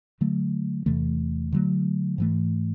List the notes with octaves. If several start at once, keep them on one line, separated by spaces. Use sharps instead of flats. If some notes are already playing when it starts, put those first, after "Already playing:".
D3 F#3 A3
E2 C3 E3 A3
D3 F#3 A3
G#2 E3 A3